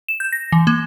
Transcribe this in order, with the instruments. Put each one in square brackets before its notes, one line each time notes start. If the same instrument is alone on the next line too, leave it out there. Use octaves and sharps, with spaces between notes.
[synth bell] E7
G6
A#6
E3
A#3